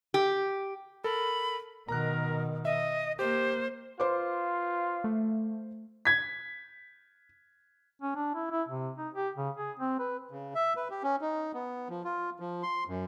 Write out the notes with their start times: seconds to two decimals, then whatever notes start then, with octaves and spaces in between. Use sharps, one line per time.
0.14 G4
1.04 A4 A#4 B5
1.89 B2 D#3 A#4 A#5 F#6
2.65 D#5 E5
3.19 A#3 G4 C5
4.00 F4 B4 C5 C6 D6
5.04 A3
6.05 G#6 B6
8.02 C#4
8.16 D4
8.35 E4
8.51 E4
8.68 C3
8.98 D#4
9.14 G4
9.36 C#3
9.57 G#4
9.79 C4
9.99 B4
10.31 C#3
10.55 E5
10.76 B4
10.90 G4
11.03 C#4
11.21 D#4
11.54 B3
11.89 F3
12.04 F4
12.40 F3
12.63 C6
12.88 F#2